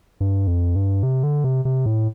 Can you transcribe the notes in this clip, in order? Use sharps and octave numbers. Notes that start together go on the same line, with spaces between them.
G2
F2
G2
C3
D3
C3
C3
A2